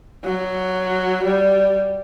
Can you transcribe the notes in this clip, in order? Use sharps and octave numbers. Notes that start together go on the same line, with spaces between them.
F#3
G3